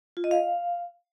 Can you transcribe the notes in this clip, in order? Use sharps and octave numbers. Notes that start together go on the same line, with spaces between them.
F4
D#5
F5